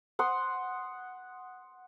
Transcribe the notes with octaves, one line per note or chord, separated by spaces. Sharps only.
F#5 C6 D#6